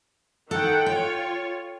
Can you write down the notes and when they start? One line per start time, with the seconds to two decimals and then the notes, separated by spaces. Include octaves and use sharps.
0.51 D#3 A4 F#5 G5
0.86 F4 C#5 G5